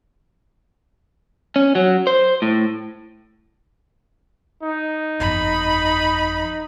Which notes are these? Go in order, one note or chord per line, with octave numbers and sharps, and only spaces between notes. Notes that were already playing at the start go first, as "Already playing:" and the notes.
C#4
F#3
C5
A2
D#4
G1 F2 B5